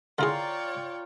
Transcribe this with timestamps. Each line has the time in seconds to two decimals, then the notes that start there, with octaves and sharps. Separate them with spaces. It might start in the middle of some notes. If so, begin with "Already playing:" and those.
0.19 D3 E4 F4 G#4 C#5 D5 G5 A#5